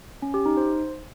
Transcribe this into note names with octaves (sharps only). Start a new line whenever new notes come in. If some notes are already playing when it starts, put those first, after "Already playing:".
C#4
G4
D#4
C5